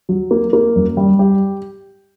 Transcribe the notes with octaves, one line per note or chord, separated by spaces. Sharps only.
F#3
A#3
A#3
F#2
G3
G4